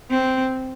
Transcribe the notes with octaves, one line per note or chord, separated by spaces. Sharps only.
C4